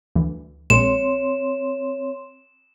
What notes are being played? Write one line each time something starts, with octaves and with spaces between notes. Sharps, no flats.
D2 E3
A#1 A#2 G#3 C4 C#5 C6 E7